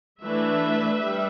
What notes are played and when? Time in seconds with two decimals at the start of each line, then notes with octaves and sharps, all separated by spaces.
0.23 E3 A3 D4 B4 E5
1.00 G3